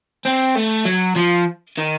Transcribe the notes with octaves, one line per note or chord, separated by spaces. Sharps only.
C4
A3
F#3
F3
D#3